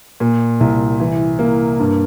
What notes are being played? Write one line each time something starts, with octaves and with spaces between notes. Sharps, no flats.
A#2
C2
E3
A#3
G2